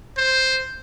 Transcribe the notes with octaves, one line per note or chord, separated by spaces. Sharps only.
C5